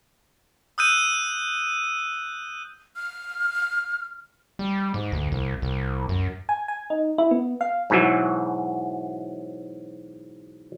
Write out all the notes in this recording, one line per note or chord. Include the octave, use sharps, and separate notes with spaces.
D#6 E6 F#6 G6 D#7
F6
G3
G#2
D2
C2
C2
F#2
G#5
G#5
D#4
E4
B3
F5
G#2 B2 E3 F#3